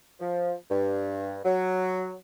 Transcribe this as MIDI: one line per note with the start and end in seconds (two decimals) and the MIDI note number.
0.20 0.54 53
0.70 1.39 43
1.45 2.14 54